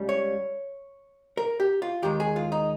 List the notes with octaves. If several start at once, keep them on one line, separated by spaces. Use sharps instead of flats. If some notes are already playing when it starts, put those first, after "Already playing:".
Already playing: C#2 C#3 G3
C#5
A#4
G4
F4
D#2 D#3 G#3 G4
G#4
F4
D#4